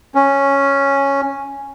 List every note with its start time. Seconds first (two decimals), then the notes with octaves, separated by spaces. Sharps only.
0.15 C#4